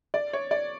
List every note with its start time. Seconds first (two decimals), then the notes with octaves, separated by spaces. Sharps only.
0.14 D5
0.33 C#5
0.51 D5